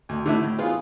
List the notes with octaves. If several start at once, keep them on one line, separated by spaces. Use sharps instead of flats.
D2
D3 A3 E4
A2
E3 B3 F4 G#4